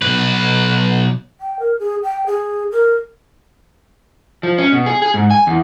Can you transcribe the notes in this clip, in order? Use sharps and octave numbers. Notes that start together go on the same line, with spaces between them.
B1 B4
G5
A#4
G#4
G5
G#4
A#4
F3
C#4
B2
G#4
G#4
G#2
G#5
E2